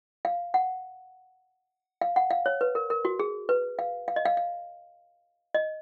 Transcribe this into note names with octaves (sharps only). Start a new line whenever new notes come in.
F5
F#5
F5
F#5
F5
C#5
B4
A#4
A#4
F#4
G#4
B4
F5
F5
D#5
F5
F5
D#5